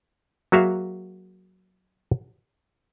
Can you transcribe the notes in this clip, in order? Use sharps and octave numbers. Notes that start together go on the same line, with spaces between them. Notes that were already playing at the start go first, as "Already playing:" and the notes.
F#3 A#3 F#4 G#4 E5 F5